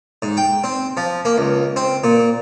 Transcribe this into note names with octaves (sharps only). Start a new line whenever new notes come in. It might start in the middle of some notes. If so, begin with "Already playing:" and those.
G#2
G5
C4
F3
A#3
C#2
C4
A#2